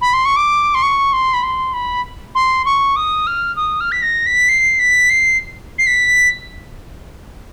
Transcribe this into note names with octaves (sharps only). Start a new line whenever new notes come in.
B5
C6
C#6
D6
C6
C#6
C6
B5
C6
B5
C6
C#6
D#6
F6
D#6
F6
B6
A#6
B6
C7
B6
C7
C7
B6